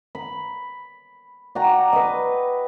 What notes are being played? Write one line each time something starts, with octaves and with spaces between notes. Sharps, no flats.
B5
D4 F#4 G5 A#5
B4 D#5